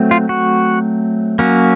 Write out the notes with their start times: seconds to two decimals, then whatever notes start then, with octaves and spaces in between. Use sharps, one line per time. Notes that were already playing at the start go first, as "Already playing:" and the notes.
Already playing: F#3 A3 C4
0.11 F4
0.29 F#4
1.39 F#3 A#3 C#4